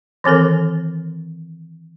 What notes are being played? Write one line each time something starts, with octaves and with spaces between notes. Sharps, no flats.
D#3 E3 C4 A4 A#4